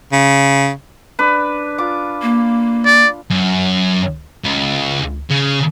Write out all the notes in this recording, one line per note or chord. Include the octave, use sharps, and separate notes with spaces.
C#3
D4 B4
F4 D6
A#3
D5
F#2
C#2
C#3